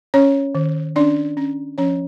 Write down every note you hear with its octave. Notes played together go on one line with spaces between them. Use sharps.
C#4 C#5
D#3
C#4 D4 D5
C#4
F3 C#4 C#5